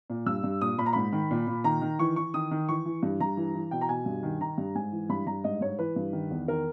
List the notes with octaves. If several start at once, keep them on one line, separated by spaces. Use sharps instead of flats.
A#2
G2 E6
G2
A#2 D#6
A#2 B5
A#5
G#2 B5
D#3
A#2
A#2
D#3 A#5
D#3
E3 C#6
E3 C#6
D#3 D#6
D#3
E3 C#6
E3
G2
G2 A#5
E3
E3
B2 G5
A#5
B2 G#5
G2
D#3
D#3 A#5
G2
G#2 G#5
E3
G2 B5
G2 A#5
G#2 D#5
G#2 C#5
E3 B4
G2
D#3
E2
D#3 A#4